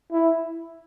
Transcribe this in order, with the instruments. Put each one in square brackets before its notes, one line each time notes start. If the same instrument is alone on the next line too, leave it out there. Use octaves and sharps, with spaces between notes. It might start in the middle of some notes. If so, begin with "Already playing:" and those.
[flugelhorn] E4